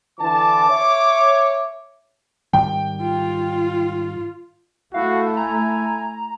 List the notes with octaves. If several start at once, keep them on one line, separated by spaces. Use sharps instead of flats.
D3 E3 A5 D6
C#5 E5
G#2 D#3 G3 G5
F4
A3 E4 F#4 F5
G#5 A#5